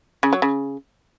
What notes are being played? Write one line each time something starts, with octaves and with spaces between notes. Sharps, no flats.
C#3
F#3
C#3